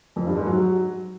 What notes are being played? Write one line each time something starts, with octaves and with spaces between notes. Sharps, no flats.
F2
G2
G#2
F#3